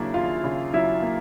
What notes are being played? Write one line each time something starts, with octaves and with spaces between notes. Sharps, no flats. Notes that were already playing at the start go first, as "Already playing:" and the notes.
Already playing: D#2 C#3 F#3 A#3 D4 E4 E5
D#2 F4 F5
C#3
F#3 E4 E5
A#3